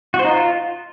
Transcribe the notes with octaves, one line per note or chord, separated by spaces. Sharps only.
F#4
C5
D#4
F4